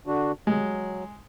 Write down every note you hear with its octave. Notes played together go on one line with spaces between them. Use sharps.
D3 D4 F#4
F#3 G#3